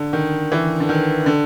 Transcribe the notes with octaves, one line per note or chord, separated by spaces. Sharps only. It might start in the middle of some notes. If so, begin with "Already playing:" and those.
Already playing: D3
D#3
E3
D3
D#3
D3